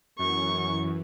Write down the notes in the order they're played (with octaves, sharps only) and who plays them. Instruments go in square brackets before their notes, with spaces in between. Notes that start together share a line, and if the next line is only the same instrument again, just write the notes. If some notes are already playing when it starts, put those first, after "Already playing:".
[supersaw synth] F#2 [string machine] E3 [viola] C#6